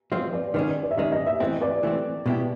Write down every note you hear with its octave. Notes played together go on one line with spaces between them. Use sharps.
F3 G#3 C4 F4 C#5
D5
D#3 G#3 C#4 D5
D5
E5
D#3 G#3 C#4 D#5
D#5
E5
E3 A3 C4 D#5
D5
E3 A3 C4
B2 G#3 B3 E4 G4